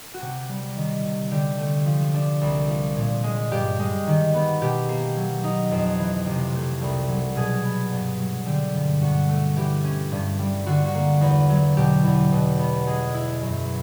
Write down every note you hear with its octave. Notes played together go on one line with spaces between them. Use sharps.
F#4
C3 G4
G3
D#3
C3
D3 G4
A3
F3
D4
C2
F3
A#2
G#3
G2 G4
G#3
D#3
B3
B2 G4
A#3
F#3
D#4
F2
E3
C3 G4
A3
C2
F#3
B2 G#4
B3
G2
F#3
D3 G4
G2
G2 F#4
A3
E3 G4
C#4
G2
G3
D3 F#4
F#4
A#3
E2
F#3
B2 G4
E2
B2
B3
G#3 G#4
E4
F#2